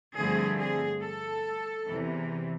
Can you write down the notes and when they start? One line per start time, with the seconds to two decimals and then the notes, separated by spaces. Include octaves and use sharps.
0.16 G2 D3 F3 A3 C4 G#4
0.59 G#4
1.02 A4
1.87 E2 C3 E3